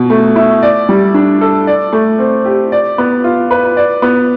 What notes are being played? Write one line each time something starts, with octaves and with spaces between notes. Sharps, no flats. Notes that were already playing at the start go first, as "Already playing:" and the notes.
Already playing: B2
A3
E4
D5
G3
D4
A4
D5
A3
C4
G4
D5
B3
F4
B4
D5
B3